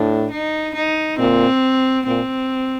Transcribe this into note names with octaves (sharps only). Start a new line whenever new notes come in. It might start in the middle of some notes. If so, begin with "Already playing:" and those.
Already playing: A2 D4
D#4
D#4
A#2 C4
A#2 C4